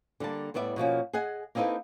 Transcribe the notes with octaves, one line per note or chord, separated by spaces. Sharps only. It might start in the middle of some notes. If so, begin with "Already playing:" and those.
D3 G3 A#3 A5
A2 G3 B3 D5 E5
B2 F3 A#3 C#4
G#4 D#5 F#5 G#5
A#3 C4 D#4 E4 A4 B4